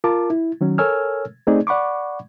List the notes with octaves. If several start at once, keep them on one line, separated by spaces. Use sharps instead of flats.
F4 A#4 A5 D6
E4
D#3 F#3 C#4
A4 A#4 C#5 G#5 E6 F6
A3 C4 D#4 G#4 D5
D5 F#5 B5 C#6 D6